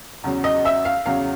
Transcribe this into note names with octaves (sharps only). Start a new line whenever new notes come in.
E2 C#3 F#3
D#5
E5
F5
E2 C#3 F#3 F5